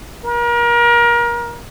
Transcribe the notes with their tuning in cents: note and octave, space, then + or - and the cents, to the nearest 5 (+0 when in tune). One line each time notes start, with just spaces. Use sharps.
A#4 +30